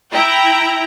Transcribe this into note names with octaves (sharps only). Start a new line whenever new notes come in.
E4 G5 A#5